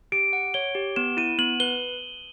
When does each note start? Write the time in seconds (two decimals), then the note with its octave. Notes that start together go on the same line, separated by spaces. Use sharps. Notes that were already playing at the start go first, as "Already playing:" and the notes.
0.12 G4 D7
0.33 F#5
0.54 C#5 G7
0.75 G4
0.96 B3 E7
1.17 E4 D#7
1.38 B3 F#7
1.60 B4 G7